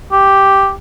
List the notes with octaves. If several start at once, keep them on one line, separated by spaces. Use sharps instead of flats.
G4